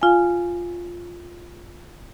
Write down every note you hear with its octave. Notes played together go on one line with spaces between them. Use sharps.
F4 F5 G#5